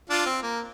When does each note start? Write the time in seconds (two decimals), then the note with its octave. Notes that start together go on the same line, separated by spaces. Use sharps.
0.10 D4 F4
0.26 C4
0.43 A#3